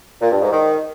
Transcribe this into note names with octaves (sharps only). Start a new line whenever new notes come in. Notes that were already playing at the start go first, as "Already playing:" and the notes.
A#2
G2
G#2
D#3